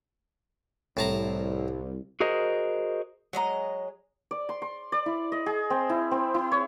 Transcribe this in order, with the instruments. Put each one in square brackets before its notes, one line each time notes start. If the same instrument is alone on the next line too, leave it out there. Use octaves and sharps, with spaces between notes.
[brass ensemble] C2 [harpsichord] A2 A5 A#5
[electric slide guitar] F#4 G#4 A#4 C5 D#5
[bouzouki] F#3 G#3 D#5 [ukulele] F#5 A#5
[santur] D5
C6
C6
D5
E4
D#5
G#4
C4
E4
C4
E4
C#5